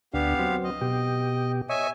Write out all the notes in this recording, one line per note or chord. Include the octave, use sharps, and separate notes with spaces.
D2 B3 D4 G4 F5
F#3 C4
D#5
B2 G4
C#5 D#5 E5 G#5